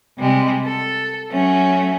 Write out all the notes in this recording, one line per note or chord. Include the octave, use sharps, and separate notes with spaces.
C3 G3 G#3
A4
F#3 A3 C#4